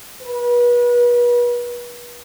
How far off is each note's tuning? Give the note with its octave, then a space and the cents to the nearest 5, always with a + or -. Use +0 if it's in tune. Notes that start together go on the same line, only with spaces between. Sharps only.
B4 -35